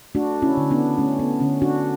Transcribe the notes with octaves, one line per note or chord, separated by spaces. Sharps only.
A3 D4 F#4
C#4 E4
D3
B3 D4
A3 C#4
B3
D3 C#4
D4 F#4